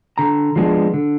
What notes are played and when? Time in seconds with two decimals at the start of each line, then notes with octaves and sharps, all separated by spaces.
0.18 D3 A#5
0.56 F3 G#3 B3 D4
0.94 D3